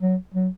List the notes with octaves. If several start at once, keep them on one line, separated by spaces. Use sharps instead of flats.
F#3
F#3